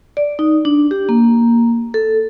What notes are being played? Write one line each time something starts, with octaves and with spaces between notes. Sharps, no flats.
D5
D#4
D4
G4
A#3
A4